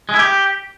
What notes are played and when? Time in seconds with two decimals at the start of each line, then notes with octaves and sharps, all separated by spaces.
0.09 G#3
0.14 E4
0.19 G4